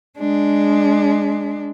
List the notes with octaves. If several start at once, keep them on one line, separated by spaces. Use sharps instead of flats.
G#3 D4